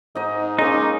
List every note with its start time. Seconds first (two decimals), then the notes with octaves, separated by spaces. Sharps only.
0.15 G#2 D#4 D#5
0.59 G#3 A#3 C#4 D#4